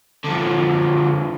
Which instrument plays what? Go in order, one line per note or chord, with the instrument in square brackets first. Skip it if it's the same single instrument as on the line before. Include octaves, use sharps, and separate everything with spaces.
[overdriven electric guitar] D3 F3